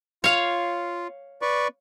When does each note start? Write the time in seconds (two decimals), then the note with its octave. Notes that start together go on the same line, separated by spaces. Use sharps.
0.24 F4 C#5 F5
1.42 B4 D5 C#6